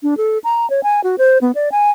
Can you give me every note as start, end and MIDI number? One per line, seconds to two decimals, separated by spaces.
0.03 0.17 62
0.17 0.38 69
0.44 0.69 82
0.70 0.83 73
0.83 1.01 80
1.04 1.16 66
1.18 1.38 72
1.41 1.52 59
1.55 1.69 74
1.72 1.91 80